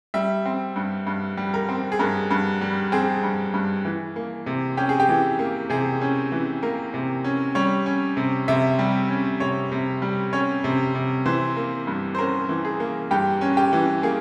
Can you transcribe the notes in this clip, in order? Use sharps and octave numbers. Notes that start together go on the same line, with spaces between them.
G3 E5
C4
G2
G2
G3
A#4
C4
G#4
G2 A#4
G2
G3
C4 G#4
G2
G2
E3
A#3
C3
C#4 G4
G#4
G4
E3
A#3
C3 G#4
C#4
E3
A#3 A#4
C3
C#4
G3 C#5
C#4
C3
C3 E5
G3
C#4
C3 C#5
C3
G3
C#4 C#5
C3
C3
E3 C5
A#3
G2
C5
C#4 A#4
E3
G#4
A#3
G2 G4
C#4
G4
E3
A#3 G#4